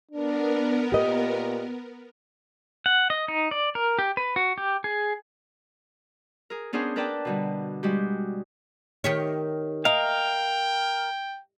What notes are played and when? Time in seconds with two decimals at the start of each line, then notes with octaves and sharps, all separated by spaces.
0.11 B3 D4 A#4
0.92 A#2 G4 D#5
2.86 F#5
3.10 D#5
3.28 D#4
3.51 D5
3.75 A#4
3.99 G4
4.17 B4
4.36 F#4
4.58 G4
4.84 G#4
6.50 G#4 A#4
6.73 B3 C#4 D4 G#4 A#4 C5
6.96 D4 A#4 B4 D5 G5 A5
7.25 B2 D3 G3
7.83 G3 G#3 F#4 G4
9.04 D#3 G4 C#5
9.85 A#4 D#5 F5 G5